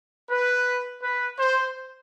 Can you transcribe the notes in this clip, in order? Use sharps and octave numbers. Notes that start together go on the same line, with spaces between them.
B4
B4
C5